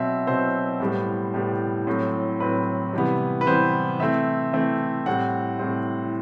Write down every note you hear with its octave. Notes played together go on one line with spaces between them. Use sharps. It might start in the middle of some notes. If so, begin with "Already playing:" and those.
Already playing: B2 F#3 C4 E5
B2 F#3 C4 C5
A2 G3 B3
A2 G3 B3
A2 F#3 C4
A2 F#3 C4 B4
C3 E3 G3 B3
B4
C3 E3 G3 B3 C5
E3 A3 C4 E5
E3 A3 C4
A2 G3 C4 F#5
A2 G3 C4